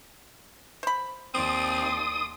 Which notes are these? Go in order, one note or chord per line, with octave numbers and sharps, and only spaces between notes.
C5 B5
D#2 C4 D5 C6 D#6